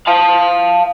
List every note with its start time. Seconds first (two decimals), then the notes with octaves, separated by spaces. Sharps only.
0.08 F5 A5